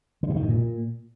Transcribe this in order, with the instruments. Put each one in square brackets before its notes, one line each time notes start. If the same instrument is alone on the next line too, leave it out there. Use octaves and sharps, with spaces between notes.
[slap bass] D3
B2
D#3
G#2
A#2